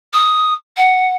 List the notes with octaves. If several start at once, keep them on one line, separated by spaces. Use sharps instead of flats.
D#6
F#5